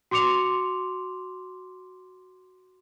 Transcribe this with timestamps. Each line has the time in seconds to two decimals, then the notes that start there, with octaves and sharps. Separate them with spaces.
0.11 F#4 C6 D6 C#7 F7